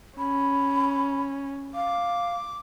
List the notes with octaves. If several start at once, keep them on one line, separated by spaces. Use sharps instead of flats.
C#4 B5
F5 D6